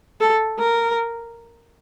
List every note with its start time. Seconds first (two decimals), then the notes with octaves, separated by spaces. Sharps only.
0.20 A4
0.59 A#4